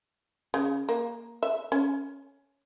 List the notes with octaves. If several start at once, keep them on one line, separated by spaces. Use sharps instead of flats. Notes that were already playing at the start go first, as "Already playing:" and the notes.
C#3
A#3
E5
C#4